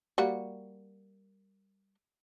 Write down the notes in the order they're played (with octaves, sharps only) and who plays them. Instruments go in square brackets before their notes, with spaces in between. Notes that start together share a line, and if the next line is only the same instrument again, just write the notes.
[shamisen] G3 A#3 F#4